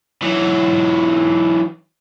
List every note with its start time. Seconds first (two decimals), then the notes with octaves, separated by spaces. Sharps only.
0.22 E3 F#3